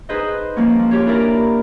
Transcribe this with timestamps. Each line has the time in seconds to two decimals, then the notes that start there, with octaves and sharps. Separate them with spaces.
0.09 D#4 G#4 B4 C5 D#5
0.56 F3 A#3 C#4
0.79 F3
0.91 F4 G4 C#5
1.06 D4 E4 A#4 D5 A#5